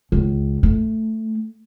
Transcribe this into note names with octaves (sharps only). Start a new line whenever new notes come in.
C#2
A3